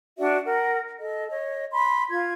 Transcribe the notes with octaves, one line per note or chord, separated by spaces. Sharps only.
D4 F#4 D5 E5
A#4 F#5
A4 D#5
C#5 D#5
B5 C6
F4 G#6